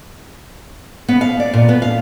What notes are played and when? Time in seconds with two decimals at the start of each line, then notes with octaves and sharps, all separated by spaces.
1.08 B3
1.21 F5
1.40 D5
1.53 A#2
1.69 B3
1.82 F5